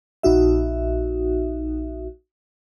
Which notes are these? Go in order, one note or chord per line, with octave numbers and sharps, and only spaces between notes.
A#1 D#4 F#4 E5